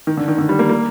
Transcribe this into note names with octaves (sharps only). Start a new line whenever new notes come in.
D#3
D3
D#3
D3
G3
A#3
A#3